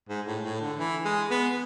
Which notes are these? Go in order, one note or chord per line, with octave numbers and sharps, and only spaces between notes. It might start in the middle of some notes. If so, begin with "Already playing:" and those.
G#2
A2
A2
D3
E3
G#3
B3